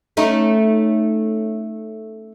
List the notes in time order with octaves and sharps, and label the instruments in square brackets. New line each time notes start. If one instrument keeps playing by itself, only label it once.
[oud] A3 C#4 D#4